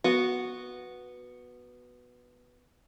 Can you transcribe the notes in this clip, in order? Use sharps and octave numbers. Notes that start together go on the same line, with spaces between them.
B3 F#4